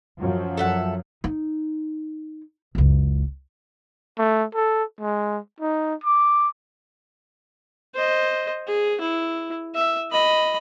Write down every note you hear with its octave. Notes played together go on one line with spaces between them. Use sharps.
F#2 F3 F#3
A4 E5 F#5
D#4
F#1 C#2
A3
A4
G#3
D#4
D6
C5 D#5
G#4
E4
E5
D#5 B5